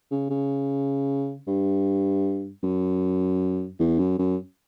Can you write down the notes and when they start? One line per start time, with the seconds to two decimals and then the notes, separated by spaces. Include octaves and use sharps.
0.11 C#3
0.30 C#3
1.47 G2
2.63 F#2
3.79 E2
3.99 F#2
4.19 F#2